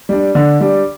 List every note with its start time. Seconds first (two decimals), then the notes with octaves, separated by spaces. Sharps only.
0.09 G3 D4
0.35 D3
0.60 G3 D4